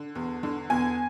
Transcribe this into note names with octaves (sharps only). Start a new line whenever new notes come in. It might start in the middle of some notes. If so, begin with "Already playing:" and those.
Already playing: D3
E2
D3
E2 G#5